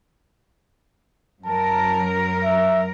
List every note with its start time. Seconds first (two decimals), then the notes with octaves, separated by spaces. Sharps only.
1.46 F#2 F#3 A#4 A5
2.44 E5